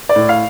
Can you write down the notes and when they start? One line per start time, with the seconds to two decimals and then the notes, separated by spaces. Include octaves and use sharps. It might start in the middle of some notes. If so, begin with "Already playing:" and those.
0.09 D5
0.16 A2
0.29 F5